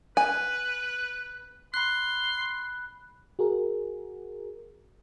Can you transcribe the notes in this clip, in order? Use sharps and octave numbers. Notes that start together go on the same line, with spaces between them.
B4 G#5
B5 C6 F#6
F#4 G#4 A#4